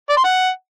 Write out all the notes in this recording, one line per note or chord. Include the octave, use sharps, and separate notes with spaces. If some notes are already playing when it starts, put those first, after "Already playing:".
D5
C6
F#5